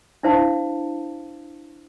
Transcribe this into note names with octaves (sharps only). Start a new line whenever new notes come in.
D4 E4 C5 F5 A5